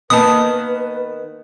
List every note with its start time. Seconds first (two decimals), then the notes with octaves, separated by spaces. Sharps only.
0.10 D#3 A#3 B3 B4 A5 D#6